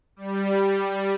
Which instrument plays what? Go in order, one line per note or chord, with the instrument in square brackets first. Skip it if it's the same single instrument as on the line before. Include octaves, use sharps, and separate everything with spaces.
[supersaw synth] G3